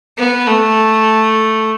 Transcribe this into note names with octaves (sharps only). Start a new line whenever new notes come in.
B3
A3